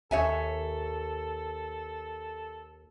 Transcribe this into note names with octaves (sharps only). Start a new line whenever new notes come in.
D#2 A4 C#5 E5 G#5